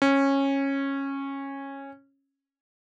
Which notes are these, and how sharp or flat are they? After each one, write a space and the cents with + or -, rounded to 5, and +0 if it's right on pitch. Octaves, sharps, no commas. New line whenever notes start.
C#4 -15